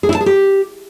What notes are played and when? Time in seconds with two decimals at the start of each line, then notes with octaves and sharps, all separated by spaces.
0.03 G#4
0.09 E4
0.15 A5
0.21 G#4
0.26 G4